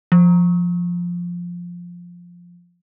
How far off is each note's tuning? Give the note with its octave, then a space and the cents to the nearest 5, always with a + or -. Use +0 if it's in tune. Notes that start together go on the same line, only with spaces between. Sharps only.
F3 +5